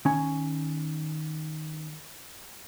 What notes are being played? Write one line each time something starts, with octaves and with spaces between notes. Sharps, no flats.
D#3 C#4 G#5